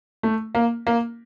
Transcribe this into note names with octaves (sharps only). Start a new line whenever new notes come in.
A3
A#3
A#3